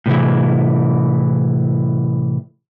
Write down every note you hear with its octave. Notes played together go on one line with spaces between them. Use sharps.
A2 C3 E3